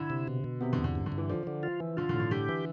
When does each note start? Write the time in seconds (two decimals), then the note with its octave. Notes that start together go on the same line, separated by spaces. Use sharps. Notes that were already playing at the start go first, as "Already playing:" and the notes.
Already playing: D3 E4
0.10 C3
0.28 B2
0.44 B2
0.61 C3 B3
0.73 D3
0.78 E2
0.84 D3
0.95 G2
1.06 D3
1.12 G2
1.18 E3
1.30 D3 F3
1.47 D3
1.63 F4
1.80 E3
1.97 D3 F4
2.09 D3
2.14 A2
2.20 D3
2.31 D3 G4
2.49 E3